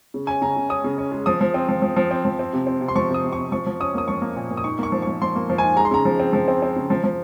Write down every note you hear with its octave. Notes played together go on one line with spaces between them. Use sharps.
C#3
C#4 G#5
C#3 A#5
C#3
C#4 D#6
C#3
C#4
G#3
F3 D#6
F3
C4
F3
F3
F3
C4
F3
C4
C3
C4
C3
C6
F3 C#6
C3
D#6
C3
C#6
C3
F3 C#6
F3
C#4 D#6
A#3 D#6
F3 C#6
A#3
A#2
A#2
D#6
D#4 C#6
A#3 C#6
F3
F3 C#6
F3 C6
A#3
F3
G#5
D#4
G#3 A#5
C6
C#3 A#5
F3
C4
F3
C4
C4
C#3
F3
F3